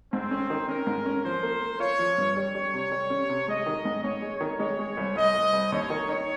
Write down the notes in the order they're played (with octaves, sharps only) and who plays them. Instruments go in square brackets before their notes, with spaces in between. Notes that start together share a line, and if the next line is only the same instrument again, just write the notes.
[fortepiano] G#2 [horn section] C4
[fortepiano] C#4
D#3
[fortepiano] C#4 [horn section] A#4
[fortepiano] G#2
C#4
[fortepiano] F3 [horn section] C5
[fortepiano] A#3
A#3
[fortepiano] F4 [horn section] C#5
[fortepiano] F3
G2
[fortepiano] G3 [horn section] C#5
[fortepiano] G3
C3
G3
C#4
C3
[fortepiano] G#3 [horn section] D#5
[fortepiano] D#3
G#2
[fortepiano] G#2 [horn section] C#5
[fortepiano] G#3
D#3
[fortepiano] G#3 [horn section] C#5
[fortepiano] G#3
C2
[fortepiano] C2 [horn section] D#5
[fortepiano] C2
C2
[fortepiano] D#2 [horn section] C#5
[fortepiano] D#3
D#4